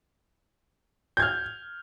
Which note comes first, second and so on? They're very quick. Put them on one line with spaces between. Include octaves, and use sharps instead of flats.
G6 G#6 F6